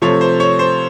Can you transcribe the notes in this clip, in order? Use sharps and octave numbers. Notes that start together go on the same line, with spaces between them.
C3 F3 A3 C#5
C5
C#5
C5